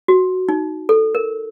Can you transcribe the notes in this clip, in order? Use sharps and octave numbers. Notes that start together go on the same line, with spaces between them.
F#4
D#4
A4
A#4